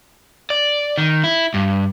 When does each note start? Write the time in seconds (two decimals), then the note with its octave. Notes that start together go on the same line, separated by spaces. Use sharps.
0.50 D5
0.98 D#3
1.24 E4
1.54 G2